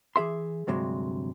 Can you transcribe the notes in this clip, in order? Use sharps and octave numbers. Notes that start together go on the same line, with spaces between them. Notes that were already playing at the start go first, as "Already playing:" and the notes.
E3 G#4 E5 C6
D2 G2 C3 F#3 G#3